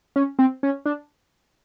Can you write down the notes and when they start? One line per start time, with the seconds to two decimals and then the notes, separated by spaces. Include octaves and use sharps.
0.16 C#4
0.39 C4
0.63 C#4
0.86 D4